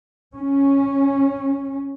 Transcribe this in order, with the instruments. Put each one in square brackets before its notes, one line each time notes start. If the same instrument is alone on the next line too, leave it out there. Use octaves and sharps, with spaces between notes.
[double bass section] C#4